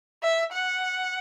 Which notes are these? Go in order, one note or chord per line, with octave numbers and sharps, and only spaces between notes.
E5
F#5